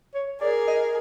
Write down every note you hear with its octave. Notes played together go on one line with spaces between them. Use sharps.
C#5
G#4 A#4 D5
D#5